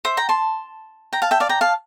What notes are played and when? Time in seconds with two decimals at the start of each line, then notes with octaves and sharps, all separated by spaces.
0.05 C5 E5
0.17 G5 A#5
0.29 A5 C6
1.13 G5 A#5
1.22 F5 A5
1.31 E5 G5
1.40 D5 F5
1.49 G5 A#5
1.61 F5 A5